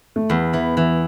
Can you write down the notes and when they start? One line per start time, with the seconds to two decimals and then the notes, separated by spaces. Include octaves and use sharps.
0.16 A3
0.30 E2 B3
0.53 E3
0.77 E3